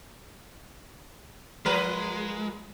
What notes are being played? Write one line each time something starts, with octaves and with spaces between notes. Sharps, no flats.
F3 G#3 A#4 B4